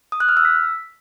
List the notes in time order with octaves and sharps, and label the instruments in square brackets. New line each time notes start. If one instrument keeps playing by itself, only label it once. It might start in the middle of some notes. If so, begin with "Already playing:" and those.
[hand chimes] D#6
F#6
F6
E6
B6